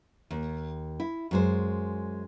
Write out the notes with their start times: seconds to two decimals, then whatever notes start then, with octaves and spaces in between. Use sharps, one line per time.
0.31 D#2
1.00 E4
1.31 F#2 G#3 C5